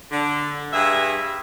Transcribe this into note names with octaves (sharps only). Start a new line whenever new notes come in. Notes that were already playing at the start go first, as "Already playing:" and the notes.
D3
G2 G#4 E5